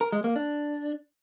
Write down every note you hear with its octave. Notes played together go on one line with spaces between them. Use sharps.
A#4
G#3
A#3
D4